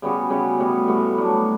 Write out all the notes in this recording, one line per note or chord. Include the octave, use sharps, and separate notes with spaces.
C#3 G3 B3 F#4
C#3 G3 B3 F#4
A2 G3 B3 F#4
A2 G3 B3 F#4
A2 F#3 B3 D4